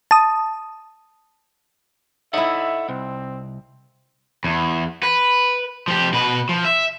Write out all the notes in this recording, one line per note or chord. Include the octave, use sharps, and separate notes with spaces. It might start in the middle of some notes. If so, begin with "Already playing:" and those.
A5 D#6
D#4 E4 A4 C#5 E5 F#5
C2 C4
E2
B4
F3 G4
B2 B4
F3
E5